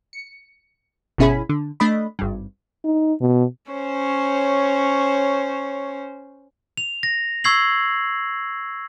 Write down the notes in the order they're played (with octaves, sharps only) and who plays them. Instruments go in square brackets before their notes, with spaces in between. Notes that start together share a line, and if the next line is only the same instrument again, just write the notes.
[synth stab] C#7
G1 B2 C#4 E4 G#4 B5
D3
A3 D4 D#5 B5
G#1 G2
[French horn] D#4
B2
[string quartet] C#4 C5 C#5
[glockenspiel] F7
A#6
C#6 E6 G#6 C7 F#7